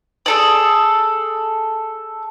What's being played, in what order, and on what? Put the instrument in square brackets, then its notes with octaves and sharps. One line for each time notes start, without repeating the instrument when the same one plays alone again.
[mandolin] G#4 A4 D5